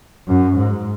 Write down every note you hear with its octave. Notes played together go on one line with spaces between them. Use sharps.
F#2
G#2